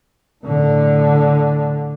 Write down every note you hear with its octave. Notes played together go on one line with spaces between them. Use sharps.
A2 D3